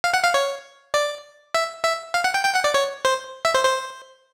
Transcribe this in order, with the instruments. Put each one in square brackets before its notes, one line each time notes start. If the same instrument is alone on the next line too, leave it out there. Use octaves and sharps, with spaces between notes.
[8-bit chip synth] F5
F#5
F5
C#5
D5
E5
E5
F5
F#5
G5
G5
F#5
D5
C#5
C5
E5
C5
C5